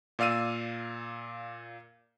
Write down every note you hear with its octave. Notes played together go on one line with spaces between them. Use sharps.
A#2 D5 F5 E6 D#7